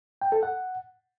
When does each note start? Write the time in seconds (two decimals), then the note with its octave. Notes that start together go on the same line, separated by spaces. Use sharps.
0.22 G5
0.32 A4
0.43 F#5